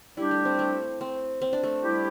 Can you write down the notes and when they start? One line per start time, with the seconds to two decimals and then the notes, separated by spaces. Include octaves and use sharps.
0.17 G3 D4 E4 G4
0.31 A3
0.45 C4
0.59 A3
1.01 C4
1.42 C4
1.53 D4
1.63 A3
1.84 G3 E4 G4